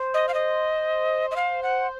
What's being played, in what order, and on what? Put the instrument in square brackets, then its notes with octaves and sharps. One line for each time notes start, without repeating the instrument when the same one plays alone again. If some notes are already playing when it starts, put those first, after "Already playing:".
Already playing: [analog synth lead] C5
[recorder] D#5
F5
D#5
D#5
F5
F#5